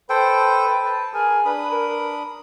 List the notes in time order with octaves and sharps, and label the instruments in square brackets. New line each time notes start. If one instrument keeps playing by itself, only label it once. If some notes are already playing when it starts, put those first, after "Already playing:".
[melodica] A4 C5 G5 [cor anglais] B4
[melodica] A5
[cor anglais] G#4 [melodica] A#4
[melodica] D4 B5 D#6 [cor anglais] B4
[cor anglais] A#4